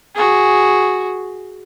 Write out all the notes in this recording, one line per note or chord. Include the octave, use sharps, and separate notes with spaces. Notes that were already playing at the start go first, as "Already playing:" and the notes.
F#4 G#4